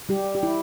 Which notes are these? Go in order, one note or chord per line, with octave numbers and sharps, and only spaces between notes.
G3 G4
G4
E4